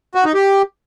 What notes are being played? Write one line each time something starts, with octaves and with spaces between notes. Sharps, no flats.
F#4
D#4
G4